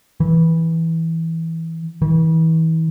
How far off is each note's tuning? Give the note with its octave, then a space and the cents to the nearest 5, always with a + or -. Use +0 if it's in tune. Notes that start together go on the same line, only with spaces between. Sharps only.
E3 -10
E3 -35